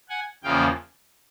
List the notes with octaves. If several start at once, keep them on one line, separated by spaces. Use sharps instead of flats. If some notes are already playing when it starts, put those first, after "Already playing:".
F#5 G#5
E2 C#3 F3 A#3 F5 G5